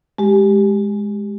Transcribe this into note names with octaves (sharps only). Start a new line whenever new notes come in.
G#3 G4